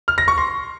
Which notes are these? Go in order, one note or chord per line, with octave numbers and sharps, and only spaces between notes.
F6
A#6
C#6
C6